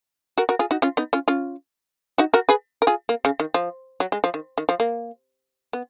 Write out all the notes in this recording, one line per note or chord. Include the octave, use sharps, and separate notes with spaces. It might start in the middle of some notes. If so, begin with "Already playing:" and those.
F#4 A#4
F#4 A#4
F4 G#4
D#4 F#4
C#4 F4
B3 D#4
C#4 F4
C#4 F4
D#4 F#4
F#4 A#4
G#4 B4
A#4
F4 G#4
A#3
C#3
D#3
F3
F#3
G#3
F3
D#3
D#3
F3
A#3
B3